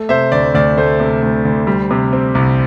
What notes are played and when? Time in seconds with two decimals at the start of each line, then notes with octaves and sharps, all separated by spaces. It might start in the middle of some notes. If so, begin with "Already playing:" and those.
Already playing: A3
0.09 C3 C5 E5
0.32 D2 D5
0.54 D2 D5
0.77 A3 C5
1.00 C3
1.23 D2
1.45 D2
1.67 G3
1.91 C3
2.13 C4
2.35 C2